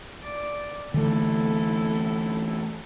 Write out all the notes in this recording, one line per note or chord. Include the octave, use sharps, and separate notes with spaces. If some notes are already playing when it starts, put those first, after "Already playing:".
D5
D3 E3 A3 E4 A4